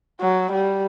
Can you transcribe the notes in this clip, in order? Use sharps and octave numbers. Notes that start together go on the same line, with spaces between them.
F#3
G3